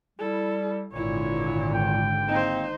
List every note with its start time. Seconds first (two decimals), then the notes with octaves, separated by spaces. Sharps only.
0.19 G3 E4 A4
0.93 G#1 A#2 D3 E4 C#5
1.74 G5
2.28 G#2 A#3 C4 D#4 C5